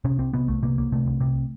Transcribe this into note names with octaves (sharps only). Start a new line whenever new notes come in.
C3 C#4
C2 C4
C3 B3
C2 A3
C3 A#3
C2 A#3
C3 A3
C2
C3